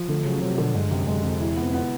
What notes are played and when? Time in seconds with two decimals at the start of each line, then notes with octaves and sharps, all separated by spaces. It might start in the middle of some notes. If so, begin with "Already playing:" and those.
Already playing: F3
0.08 D3 A3
0.25 C#3 F#3
0.42 C3 F#3
0.58 B2 D3
0.75 G2 G#3
0.91 F#2 C3
1.07 F#2 G#3
1.24 F2 C3
1.40 E2 E4
1.56 B3
1.62 F2
1.74 B3